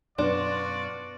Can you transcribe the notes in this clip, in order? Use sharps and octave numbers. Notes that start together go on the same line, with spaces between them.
F#2 B2 D4 F4 F#4 B4 D5 C6